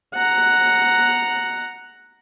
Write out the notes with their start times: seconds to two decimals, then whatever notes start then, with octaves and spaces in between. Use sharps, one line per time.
0.14 F#5 A#5